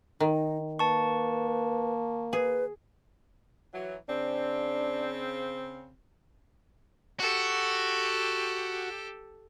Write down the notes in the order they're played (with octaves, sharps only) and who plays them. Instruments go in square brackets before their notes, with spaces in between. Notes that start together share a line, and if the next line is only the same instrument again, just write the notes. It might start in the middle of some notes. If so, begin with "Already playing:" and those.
[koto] D#3 [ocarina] D#4
[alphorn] A#3 [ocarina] B4 [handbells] A5 C#6
[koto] G#4 [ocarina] B4
[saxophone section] E3 F#3
[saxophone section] C#3 C4 [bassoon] D4
[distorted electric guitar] F#4 [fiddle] G4 A4